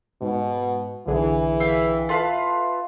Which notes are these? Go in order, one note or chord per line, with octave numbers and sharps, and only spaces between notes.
G#2 B2
B1 D3 E3 G#4
E5 F5 G5
F4 A4 B4 E5 F5 A5